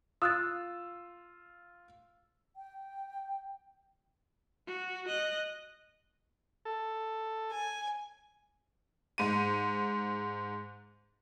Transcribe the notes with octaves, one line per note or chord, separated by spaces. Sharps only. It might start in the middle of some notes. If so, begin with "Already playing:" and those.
F4 D#6 E6 F#6 A6
G5
F#4
D#5 F#6
A4
G#5
G#2 D#7